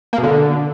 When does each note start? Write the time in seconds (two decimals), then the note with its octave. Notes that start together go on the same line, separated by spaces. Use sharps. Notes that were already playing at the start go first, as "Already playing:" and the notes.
0.13 A#3
0.18 B2
0.23 D3